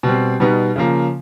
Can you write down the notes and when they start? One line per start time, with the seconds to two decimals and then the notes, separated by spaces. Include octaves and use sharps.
0.03 B2 G3 C4
0.40 B2 G3 B3 D#4
0.76 C#3 F3 A#3